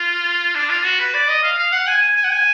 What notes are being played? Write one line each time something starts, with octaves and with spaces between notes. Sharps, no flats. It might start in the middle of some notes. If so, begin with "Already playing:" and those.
Already playing: F4
D4
F4
F#4
B4
D5
D#5
F5
F5
F#5
G#5
G#5
G#5
F#5
G#5